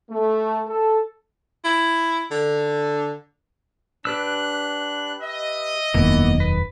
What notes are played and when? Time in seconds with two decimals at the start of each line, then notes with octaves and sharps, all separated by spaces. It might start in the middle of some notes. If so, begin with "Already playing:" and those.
0.11 A3
0.68 A4
1.64 E4
2.31 D3
4.05 D4 G4 B4 E6 F#6
5.21 D#5 E5
5.94 E1 F#2 D#3 E3 A#3 B3
6.40 B4